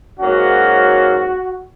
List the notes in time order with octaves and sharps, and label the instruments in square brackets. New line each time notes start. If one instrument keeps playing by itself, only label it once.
[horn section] G#2 F#3 A#3 C#4 F#4